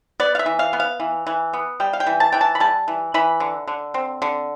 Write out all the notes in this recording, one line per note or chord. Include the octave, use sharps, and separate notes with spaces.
B3 D5
F5
E5
E3
F5
B3
F5
E3
E3
B3
G3 G5
F5
G5
E3
A5
E3 G5
A5
B5
G3 A5
E3
E3 B5
D3
D3
C4
D3